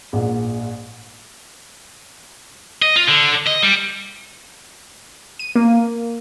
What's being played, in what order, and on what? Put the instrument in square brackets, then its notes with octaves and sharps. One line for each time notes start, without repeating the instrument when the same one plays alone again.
[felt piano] A#1 G#2
[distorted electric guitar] D#5
F4
D3
D#5
G3
[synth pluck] D#7
A#3